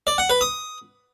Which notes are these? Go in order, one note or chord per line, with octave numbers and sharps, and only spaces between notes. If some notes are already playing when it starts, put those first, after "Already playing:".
D5
F#5
B4
D#6